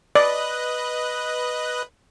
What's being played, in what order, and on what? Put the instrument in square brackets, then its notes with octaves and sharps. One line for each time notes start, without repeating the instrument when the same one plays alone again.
[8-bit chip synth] B4 D#5 F#6 [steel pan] D5